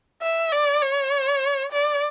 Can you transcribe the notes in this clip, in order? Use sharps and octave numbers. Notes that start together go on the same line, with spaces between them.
E5
D5
C#5
D5